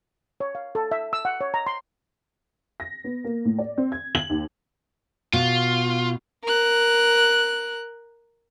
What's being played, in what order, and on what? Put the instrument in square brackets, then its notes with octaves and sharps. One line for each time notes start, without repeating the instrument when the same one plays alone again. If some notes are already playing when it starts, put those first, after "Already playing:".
[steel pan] C#5
F5
A4
E5
E6
F#5
C#5
A#5
C6
[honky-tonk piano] A#6
B3
A#3
A2
D5
C4
G#6
F#7
D#2
[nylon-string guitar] B2 [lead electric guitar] F4
[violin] A#4 F#6